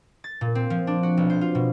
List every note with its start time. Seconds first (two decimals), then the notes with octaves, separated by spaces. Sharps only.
0.24 A6
0.41 A#2
0.55 C4
0.70 F3
0.87 D4
1.03 F#4
1.17 B1
1.30 C5
1.41 F4
1.55 B2